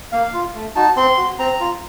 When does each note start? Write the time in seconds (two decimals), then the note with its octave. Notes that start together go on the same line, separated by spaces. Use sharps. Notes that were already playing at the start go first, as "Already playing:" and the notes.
0.12 A#3 F5
0.33 F4
0.55 A3
0.75 D#4 F#4 A5
0.96 C4 C6
1.18 F#4
1.39 C4 A#5
1.60 F4